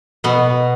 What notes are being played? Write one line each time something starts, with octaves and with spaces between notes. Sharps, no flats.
B2 B3